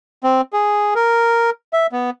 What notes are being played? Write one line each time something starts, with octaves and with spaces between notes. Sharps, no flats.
C4
G#4
A#4
E5
B3